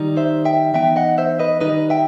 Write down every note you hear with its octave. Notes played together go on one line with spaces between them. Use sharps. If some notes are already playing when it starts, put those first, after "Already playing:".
Already playing: D#3 G3 D#4
C5 E5
E5 G5
E3 B3 D#4 E5 G5
D#5 F#5
C5 E5
B4 D#5
D#3 G3 D#4 B4 D#5
E5 G5